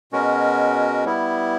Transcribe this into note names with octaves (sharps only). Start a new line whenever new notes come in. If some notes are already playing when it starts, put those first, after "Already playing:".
B2 G#3 C#4 F#4 A#4
G3 B3 E4